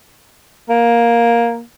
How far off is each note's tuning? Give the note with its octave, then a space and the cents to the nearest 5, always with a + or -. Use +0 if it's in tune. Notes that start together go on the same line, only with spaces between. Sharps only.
A#3 +10